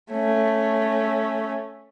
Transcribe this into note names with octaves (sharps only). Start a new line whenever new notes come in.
A3 C#4